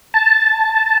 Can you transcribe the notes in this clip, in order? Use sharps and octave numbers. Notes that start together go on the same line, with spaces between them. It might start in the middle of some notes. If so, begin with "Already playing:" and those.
A5